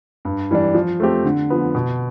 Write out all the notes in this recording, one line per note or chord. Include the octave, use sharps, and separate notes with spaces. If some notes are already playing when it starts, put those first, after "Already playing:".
G2
E3 G3 D4
F3
A3 C4 G4
D3
F3 B3
B2